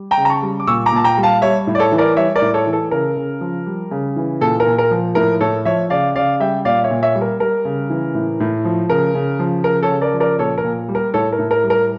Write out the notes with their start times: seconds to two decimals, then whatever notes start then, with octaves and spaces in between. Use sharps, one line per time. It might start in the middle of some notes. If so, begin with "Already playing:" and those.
Already playing: G3
0.11 G5 A#5
0.17 C#3
0.25 A#5
0.30 A5 C#6
0.42 G3
0.60 D6
0.67 A#2 C#6 E6
0.86 A#5 D6
0.93 A#2 A5
1.04 G5 A#5
1.17 G3
1.23 F5 A5
1.42 G3 C#5 E5
1.67 A2
1.75 D5
1.79 A4 C#5
1.92 E3
1.98 A#4 D5
2.16 G3 C#5 E5
2.35 A#4 D5
2.42 A2
2.54 A4 C#5
2.67 E3
2.73 A4
2.91 C#3 A#4
3.17 C#3
3.41 F3
3.66 G3
3.91 C#3
4.16 E3
4.41 A#2 A4
4.60 A#4
4.66 A#2
4.78 A#4
4.91 F3
5.15 A2 A#4
5.41 A2 A4 C#5
5.65 F3 C#5 E5
5.90 C#3 D5 F5
6.15 C#3 D5 F5
6.40 G3 E5 G5
6.65 A#2 D5 F5
6.84 C#5 E5
6.90 A#2
7.02 C#5 E5
7.15 G3
7.21 A#4
7.40 G3 A#4
7.65 C#3
7.90 E3
8.15 A2
8.40 A2
8.65 F3
8.89 C#3 A#4
9.15 C#3
9.39 F3
9.64 C#3 A#4
9.83 A4 C#5
9.89 C#3
10.01 A#4 D5
10.14 F3
10.20 A#4 D5
10.39 A#2 A4 C#5
10.58 A#4
10.64 A#2
10.88 G3
10.95 A#4
11.14 A2 A4 C#5
11.32 A#4
11.39 A2
11.51 A#4
11.64 G3
11.70 A#4